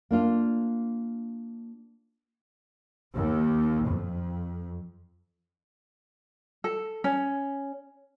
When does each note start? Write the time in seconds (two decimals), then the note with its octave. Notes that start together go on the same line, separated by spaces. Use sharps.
0.11 A#3 D4 F4
3.15 D#2
3.87 F2
6.64 A4
7.04 C#4